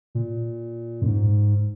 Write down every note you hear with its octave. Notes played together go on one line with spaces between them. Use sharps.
A#2
F#2
G#2